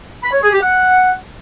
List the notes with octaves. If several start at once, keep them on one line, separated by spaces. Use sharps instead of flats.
B5
C#5
G#4
G4
F#5